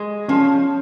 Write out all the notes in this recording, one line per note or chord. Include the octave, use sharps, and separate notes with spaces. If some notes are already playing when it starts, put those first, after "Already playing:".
Already playing: G#3
F3 C#4